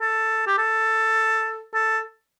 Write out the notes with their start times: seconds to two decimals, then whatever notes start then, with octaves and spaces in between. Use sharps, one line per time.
0.01 A4
0.46 G4
0.58 A4
1.74 A4